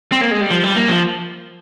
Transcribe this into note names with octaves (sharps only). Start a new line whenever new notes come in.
C4
A#3
G#3
G3
F3
G3
A#3
F3